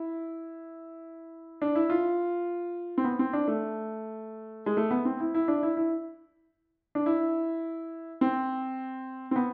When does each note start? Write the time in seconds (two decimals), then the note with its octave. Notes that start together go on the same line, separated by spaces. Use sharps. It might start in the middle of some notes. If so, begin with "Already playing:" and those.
Already playing: E4
1.62 D4
1.75 E4
1.90 F4
2.98 C4
3.04 B3
3.19 C4
3.33 D4
3.48 A3
4.66 G#3
4.77 A3
4.91 B3
5.05 C4
5.20 E4
5.34 E4
5.48 D4
5.63 E4
5.77 E4
6.95 D4
7.06 E4
8.21 C4
9.31 C4
9.36 B3